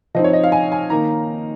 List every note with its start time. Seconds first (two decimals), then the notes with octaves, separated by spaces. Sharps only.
0.15 F3 C4 D#4 D#5
0.24 C#5
0.33 D#5
0.44 F5
0.52 G#5
0.72 G#5
0.90 D#3 A#3 D#4 A#5